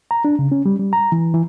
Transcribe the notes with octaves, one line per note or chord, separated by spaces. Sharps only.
A#5
D4
C#3
C#4
G3
G3
A#5
E3
E3